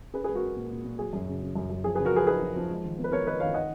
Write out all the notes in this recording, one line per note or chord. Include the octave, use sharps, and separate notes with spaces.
C#4 G#4 B4
G#4 B4
G#3
F#4 A#4
C#4
A#2
A#2
A#2
F#3 G#4
F#2
C#3
C#3
F#2
F#2
F3 G#4
C#3 G#4 B4
F#4 A#4
F3 G#4 B4
D#4 G#4 B4
F3
F3
G#3
D#3
B3
B4
B3 A#4 C#5
D#3 B4 D#5
D#3 C#5 F5
D#4 D#5 F#5